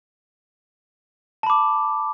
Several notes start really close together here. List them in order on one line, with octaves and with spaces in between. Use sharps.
A5 B5 D6